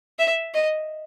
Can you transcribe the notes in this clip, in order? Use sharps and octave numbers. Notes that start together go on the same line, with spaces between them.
E5
D#5